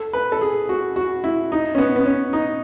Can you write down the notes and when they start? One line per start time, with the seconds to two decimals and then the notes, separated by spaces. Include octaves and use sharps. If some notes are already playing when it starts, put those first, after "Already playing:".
Already playing: A4
0.13 B4
0.32 A4
0.41 G#4
0.69 F#4
0.96 F#4
1.24 E4
1.52 D#4
1.75 C#4
1.78 B3
1.96 B3
2.06 C#4
2.33 D#4